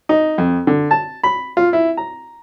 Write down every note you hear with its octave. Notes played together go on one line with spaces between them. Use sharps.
D#4
F2
D3
A5
B5
F4
E4
A#5